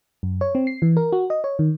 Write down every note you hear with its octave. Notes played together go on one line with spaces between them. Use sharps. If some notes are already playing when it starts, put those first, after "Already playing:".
F#2
C#5
C4
C7
E3
A#4
F#4
D#5
C#5
D#3